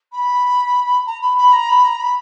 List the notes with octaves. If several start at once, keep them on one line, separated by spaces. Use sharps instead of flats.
B5
A#5
B5
B5
A#5
B5
A#5
B5